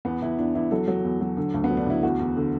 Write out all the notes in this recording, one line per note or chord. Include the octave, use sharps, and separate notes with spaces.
E2 B3
E2 E4
E2 D4
E2 E4
F#3 A4
F#3
E2
F#3
D3
D2
B3
F#3
D4
D2 E4
E2 F#4
E2
D3